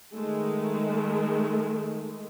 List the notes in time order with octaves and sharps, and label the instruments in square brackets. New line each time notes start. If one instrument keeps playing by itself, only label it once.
[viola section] D#3 G#3 A3